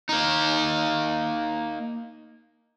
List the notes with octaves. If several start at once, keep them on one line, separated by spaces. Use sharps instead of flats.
A#3 D#4